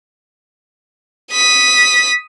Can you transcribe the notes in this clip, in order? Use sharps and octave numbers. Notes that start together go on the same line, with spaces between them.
D#6 B6